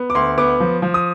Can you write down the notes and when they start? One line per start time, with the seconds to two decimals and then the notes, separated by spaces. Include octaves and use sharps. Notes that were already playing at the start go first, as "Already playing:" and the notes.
Already playing: B3
0.10 D6
0.15 D2 C6
0.38 B3 D6
0.60 F3
0.82 F3
0.94 D#6